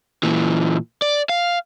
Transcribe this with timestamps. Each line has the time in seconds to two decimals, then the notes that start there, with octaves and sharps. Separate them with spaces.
0.23 A#2 E3
1.02 D5
1.29 F5